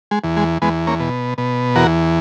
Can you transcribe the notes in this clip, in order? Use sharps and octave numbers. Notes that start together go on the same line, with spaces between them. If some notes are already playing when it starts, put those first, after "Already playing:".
G#3
E2
G#3
E2 G#3 B3
A#3 C#4
B2
B2
E2 F#4 A#4